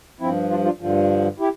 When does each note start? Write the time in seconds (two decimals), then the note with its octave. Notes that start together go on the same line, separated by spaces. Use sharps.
0.20 G2 F3 C4 E4
0.50 D4 F4
0.65 D4 F4
0.80 G2 D3 F3
1.40 E4 G4